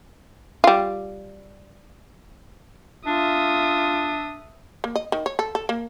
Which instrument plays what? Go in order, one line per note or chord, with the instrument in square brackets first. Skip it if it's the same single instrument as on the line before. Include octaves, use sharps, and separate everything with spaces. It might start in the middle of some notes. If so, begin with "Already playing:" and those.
[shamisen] G3 F4
[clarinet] D4 [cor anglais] F4 [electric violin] E5 D#6
[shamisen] A#3
D#5
D#3
C#5
A4
A4
A#3